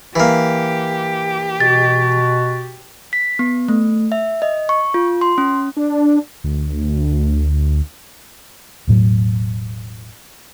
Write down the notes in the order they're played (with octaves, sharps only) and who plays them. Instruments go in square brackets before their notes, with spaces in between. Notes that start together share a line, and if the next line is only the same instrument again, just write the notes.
[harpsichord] E3 A#3 [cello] G4
[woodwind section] B2 F#4 [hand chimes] A6
[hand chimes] B6
B3
A3
E5
D#5
C#6
F4
C6
C#4
[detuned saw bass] D4
D2
[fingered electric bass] E1 A2 F#3